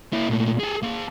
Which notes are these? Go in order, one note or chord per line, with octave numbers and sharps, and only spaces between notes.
A#3 E4
A#2 A3
G#4 A4
A#3 A5